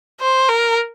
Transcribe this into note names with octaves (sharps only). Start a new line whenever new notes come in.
C5
A#4